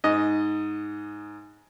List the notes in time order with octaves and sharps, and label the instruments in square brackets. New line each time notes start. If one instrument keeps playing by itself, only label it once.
[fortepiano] G#2 D#5